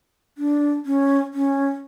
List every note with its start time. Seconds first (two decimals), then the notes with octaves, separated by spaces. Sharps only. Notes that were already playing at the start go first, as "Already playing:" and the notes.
0.38 D4
0.85 C#4
1.34 C#4